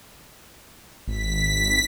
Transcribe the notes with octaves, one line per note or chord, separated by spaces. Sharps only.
G#1 B6